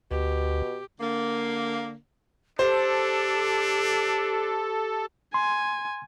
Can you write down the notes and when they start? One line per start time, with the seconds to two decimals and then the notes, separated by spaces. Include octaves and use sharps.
0.11 D2 B2 G4
1.00 D3 A#3
2.59 D4 G4 A4 C5
5.34 G#5 C6